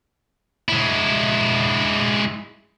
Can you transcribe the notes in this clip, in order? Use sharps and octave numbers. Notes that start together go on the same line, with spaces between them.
G#3 E4